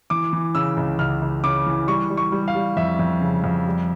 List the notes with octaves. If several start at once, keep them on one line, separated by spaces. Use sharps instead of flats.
E3 D6
E3
C#3 E6
C#2
C#2 F6
C#2
C#3 D6
E3
G3 C#6
G3
C#6
G3
F5
G3
F2 E5
F2
C#3
F2
G3